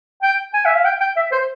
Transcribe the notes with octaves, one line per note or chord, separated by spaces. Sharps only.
G5
G#5
E5
F5
G5
G5
E5
C5